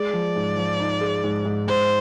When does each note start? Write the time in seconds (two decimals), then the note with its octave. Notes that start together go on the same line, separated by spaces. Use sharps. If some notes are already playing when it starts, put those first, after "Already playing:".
Already playing: G#3 D5
0.13 F3
0.36 G#2
0.57 F3
0.80 D#4
1.01 G#3
1.24 G#2
1.45 G#2
1.68 G#2 C5